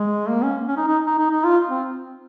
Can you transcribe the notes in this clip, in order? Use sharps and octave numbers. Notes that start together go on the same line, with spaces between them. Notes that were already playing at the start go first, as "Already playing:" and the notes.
Already playing: G#3
A#3
C#4
C#4
D#4
D#4
D#4
D#4
D#4
F4
C4